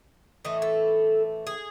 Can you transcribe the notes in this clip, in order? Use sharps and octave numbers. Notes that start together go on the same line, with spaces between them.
A2 E3 A3 D#5
A4
G#4